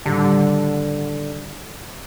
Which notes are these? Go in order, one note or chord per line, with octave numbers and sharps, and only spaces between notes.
A2 D3 D#3 G3